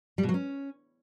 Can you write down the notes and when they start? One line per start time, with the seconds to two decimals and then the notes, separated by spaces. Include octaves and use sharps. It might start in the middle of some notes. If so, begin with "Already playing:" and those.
0.18 G3
0.23 B2
0.29 F#3
0.34 C#4